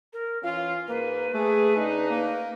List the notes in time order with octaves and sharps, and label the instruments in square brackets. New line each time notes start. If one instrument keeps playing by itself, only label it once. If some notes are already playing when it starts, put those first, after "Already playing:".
[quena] A#4
[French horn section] E3 C#4 F4 [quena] F5
[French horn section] G#2 A#3 [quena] B4
[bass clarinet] A3 [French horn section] G#4
[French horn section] C#3 D4 D#4
[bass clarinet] A#3